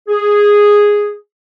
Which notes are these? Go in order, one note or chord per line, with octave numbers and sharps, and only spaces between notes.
G#4